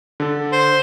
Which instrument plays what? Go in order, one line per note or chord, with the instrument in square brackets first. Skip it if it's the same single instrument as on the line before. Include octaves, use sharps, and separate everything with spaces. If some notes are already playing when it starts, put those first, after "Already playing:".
[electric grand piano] D3 A4
[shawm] C5